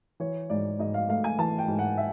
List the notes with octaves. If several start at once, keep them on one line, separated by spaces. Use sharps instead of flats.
E3 C#5
G#2 D5
G#2 D#5
F5
A3 F5
G#5
E3 A5
G5
G#2
F#5
E5